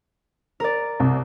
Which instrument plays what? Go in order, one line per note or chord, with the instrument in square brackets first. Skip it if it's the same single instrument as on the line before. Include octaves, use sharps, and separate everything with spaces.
[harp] A#4 D5
[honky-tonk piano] C2